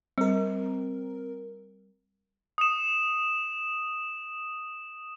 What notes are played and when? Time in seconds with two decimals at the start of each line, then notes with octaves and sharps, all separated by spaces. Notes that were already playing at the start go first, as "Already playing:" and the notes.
0.18 G3 C4 A#4
2.58 D#6 E7